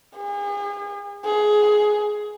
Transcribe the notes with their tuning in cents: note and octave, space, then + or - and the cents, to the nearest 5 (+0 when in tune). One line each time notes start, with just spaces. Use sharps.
G#4 -40
G#4 +15